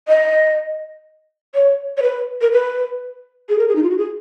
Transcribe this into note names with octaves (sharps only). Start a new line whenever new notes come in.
D#5
C#5
C#5
B4
A#4
B4
G#4
A#4
G#4
D#4
F4
F#4
G#4